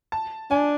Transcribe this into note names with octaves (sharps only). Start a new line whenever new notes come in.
A5
D4 G#5